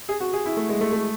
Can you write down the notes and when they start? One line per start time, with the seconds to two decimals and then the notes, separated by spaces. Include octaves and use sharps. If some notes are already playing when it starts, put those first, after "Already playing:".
0.09 G#4
0.21 F#4
0.33 G#4
0.46 E4
0.57 A3
0.69 G#3
0.81 A3
0.92 A3